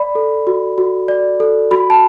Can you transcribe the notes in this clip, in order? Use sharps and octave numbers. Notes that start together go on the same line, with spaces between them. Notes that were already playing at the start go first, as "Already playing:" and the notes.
Already playing: D5 B5
A4
F#4
F#4
D5
A4
F#4 B5
A5